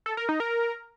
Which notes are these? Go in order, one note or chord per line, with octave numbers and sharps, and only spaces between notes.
A4
A#4
D#4
A#4